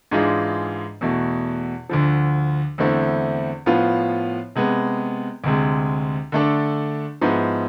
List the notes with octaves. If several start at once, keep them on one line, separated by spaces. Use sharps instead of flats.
G#2 E3 G#3 D4 F4
E2 B2 A3
D2 D3 F3
E2 D3 A3 C4 E4
A2 F3 B3 F4
C3 G#3 B3
D2 C3 G#3
D3 A3 D4 A4
G#2 F3 B3 E4